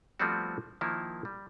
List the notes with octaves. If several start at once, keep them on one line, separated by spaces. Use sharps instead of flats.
F3 G3 A3 B3 C4 F#4
D#3 F3 A#3 E4
G3